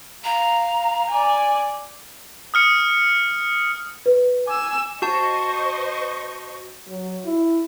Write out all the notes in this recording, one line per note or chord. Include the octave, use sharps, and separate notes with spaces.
F5 A#5
D5 G#5
D#6 F6 C#7
B4
G#5 D6 E6
F#4 C5 D#5 A5 C#6
F#3
E4